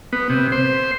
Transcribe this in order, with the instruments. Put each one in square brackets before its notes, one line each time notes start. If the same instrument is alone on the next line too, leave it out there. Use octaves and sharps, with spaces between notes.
[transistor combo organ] B3
C3
C5